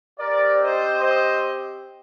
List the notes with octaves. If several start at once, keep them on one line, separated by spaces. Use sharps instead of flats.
C4 G4 A#4 D5
C5 D#5
C5 D#5